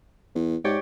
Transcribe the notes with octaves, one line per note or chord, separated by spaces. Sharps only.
E2
G#2 G4 C#5 D5